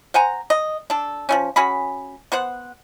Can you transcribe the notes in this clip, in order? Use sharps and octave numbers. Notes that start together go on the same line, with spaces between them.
C5 F#5 G#5 A#5
D#5
D4 A4
F3 G3 C#4
C#4 F#4 G#4 B5
B3 C5 F#5